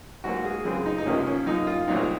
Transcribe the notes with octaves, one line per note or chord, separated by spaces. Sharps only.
G#2 F#3 A#3 F#4
G#4
F#2 C#3 G#3 C4 G#4
D#4
D#4
C2 C3 F3 A#3 C#4
C#4
F#2 F3 A#3 D#4
F4
C2 A#2 F#3 C4 D#4